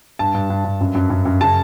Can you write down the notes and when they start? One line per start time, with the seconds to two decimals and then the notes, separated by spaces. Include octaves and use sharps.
0.19 G2 A5
0.35 G2
0.50 G2
0.64 G2
0.81 F#2
0.95 F#2
1.10 F#2
1.25 F#2
1.41 C#3 A5